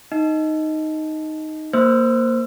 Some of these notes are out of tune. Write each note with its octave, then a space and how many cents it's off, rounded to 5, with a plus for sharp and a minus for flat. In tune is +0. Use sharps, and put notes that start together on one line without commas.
D#4 +0 D#5 +10
A#3 -5 C5 +0 E6 +40